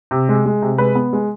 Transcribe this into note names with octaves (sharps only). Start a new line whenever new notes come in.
C3
G#3
G#3
C3
G#3 B4
B3
G#3